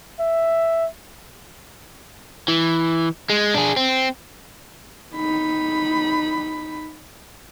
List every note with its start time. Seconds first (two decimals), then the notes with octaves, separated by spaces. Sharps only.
0.20 E5
2.48 E3
3.30 G#3
3.54 D4 G#4
3.77 C4
5.15 D#4 B5